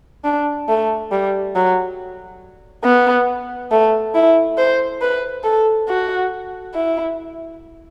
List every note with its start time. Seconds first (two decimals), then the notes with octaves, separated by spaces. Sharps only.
0.24 D4
0.69 A3
1.11 G3
1.55 F#3
2.85 B3
3.71 A3
4.15 E4
4.58 C5
5.01 B4
5.44 A4
5.88 F#4
6.74 E4